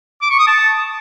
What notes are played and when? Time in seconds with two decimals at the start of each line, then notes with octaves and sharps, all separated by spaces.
0.22 D6
0.31 C#6
0.39 D#6
0.48 A5